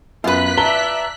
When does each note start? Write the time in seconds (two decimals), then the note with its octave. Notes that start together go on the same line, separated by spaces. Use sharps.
0.24 F#2 B3 F4 A#4 B4 F#6 B6
0.58 D5 E5 A5 A#5 G7